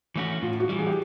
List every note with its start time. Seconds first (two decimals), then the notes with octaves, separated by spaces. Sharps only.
0.16 E3 A3 C#4 F#4
0.42 A2 F4
0.60 F#4
0.69 E3 G3
0.78 G#4
0.87 G4